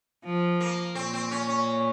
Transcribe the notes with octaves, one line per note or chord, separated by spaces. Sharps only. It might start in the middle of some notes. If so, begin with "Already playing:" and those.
F3
A#3
A#2 C4
C4
C#4
C#4